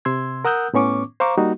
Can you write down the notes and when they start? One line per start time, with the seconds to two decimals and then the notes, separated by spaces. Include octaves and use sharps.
0.05 C3 C6 E6 G#6
0.45 A#4 F#5 D#6 E6 F#6 G6
0.74 A2 B3 C#4 C#6 D6
1.20 C5 F5 A#5 C#6 D6
1.38 G3 A#3 D#4 F#4